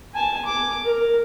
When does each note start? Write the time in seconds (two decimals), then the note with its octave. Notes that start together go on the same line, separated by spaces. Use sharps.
0.14 G#5 A5
0.45 D6
0.84 A#4